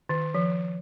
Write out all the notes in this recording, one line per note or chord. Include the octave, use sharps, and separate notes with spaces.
D#3
F3